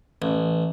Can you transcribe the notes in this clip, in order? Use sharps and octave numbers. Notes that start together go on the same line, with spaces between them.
A1